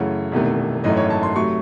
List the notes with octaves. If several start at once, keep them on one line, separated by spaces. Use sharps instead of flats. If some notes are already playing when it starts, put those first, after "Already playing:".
Already playing: F#2 C#3 E3 A3 F#5
E1 E2 C3 D#3 A3
G#1 F#2 E3 A3 D#5
C#5
A5
C6
C3 F#3 A3 C#6